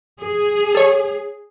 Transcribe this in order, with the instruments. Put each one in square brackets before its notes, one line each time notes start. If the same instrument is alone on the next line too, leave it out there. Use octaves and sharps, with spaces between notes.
[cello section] G#4
[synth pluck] A4 C#5